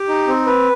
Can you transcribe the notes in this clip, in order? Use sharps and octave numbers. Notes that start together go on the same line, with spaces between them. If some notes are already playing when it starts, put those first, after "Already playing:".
Already playing: G4
D#4
C4
B4